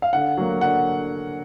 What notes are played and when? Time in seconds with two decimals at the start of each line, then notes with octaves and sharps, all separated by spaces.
0.02 F5
0.13 D3 F#5
0.37 F#3 A#3
0.61 D3 F#5